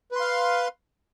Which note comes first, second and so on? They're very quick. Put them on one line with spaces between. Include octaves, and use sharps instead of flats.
B4 C6 F5